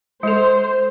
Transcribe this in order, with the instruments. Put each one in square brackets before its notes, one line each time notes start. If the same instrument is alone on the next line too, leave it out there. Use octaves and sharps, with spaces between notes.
[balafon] G#3 A4 [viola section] C5